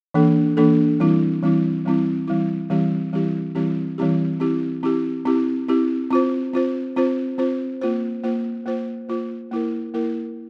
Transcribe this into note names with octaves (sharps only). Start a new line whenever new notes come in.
E3 A#3 D4 A4
E3 A#3 D4 A4
E3 G3 C4 E4
E3 G3 C4 E4
E3 G3 C4 E4
E3 G3 C4 E4
E3 G3 C4 E4 G4
E3 G3 C4 E4 G4
E3 G3 C4 E4 G4
E3 G3 C4 E4 G4
C4 E4 G4
C4 E4 G4
C4 E4 G4
C4 E4 G4
C4 F4 C5
C4 F4 C5
C4 F4 C5
C4 F4 C5
A#3 F4 C5
A#3 F4 C5
A#3 F4 C5
A#3 F4 C5
A#3 E4 A#4
A#3 E4 A#4